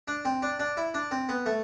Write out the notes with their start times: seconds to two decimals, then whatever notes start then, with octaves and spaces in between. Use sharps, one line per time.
0.08 D4
0.25 C4
0.42 D4
0.59 D4
0.77 E4
0.94 D4
1.11 C4
1.29 B3
1.46 A3